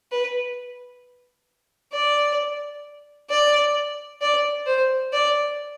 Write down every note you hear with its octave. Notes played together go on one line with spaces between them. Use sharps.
B4
D5
D5
D5
C5
D5